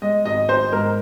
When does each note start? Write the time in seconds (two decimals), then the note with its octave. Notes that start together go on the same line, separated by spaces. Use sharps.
0.02 G#3 D#5
0.25 G#1 D#5
0.48 G#1 C5
0.72 G#2 A#4